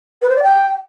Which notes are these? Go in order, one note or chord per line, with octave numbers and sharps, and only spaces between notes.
B4
C5
D5
G5